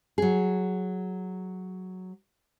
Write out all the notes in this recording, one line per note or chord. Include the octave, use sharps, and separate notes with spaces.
F#3 G#4